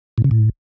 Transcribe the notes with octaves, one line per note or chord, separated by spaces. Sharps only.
A2
C#3
A2